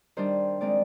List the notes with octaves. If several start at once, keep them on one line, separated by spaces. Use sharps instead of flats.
D#3 G3 D4 C5
D#3 G#3 C4 D5